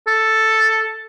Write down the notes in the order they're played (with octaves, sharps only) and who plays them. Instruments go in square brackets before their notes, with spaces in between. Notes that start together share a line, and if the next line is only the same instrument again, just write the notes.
[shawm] A4